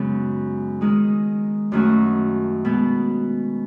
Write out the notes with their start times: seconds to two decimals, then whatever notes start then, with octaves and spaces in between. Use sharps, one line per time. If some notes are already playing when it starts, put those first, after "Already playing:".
Already playing: F#2 C#3 G#3 B3
0.81 D#3 G#3 D#4
1.72 F#2 D#3 A3 C#4 F#4
2.65 B2 G#3 B3